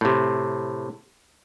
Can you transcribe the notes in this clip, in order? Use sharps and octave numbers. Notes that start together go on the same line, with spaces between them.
A2 C3